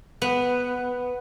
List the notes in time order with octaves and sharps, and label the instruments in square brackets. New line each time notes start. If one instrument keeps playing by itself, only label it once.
[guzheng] B3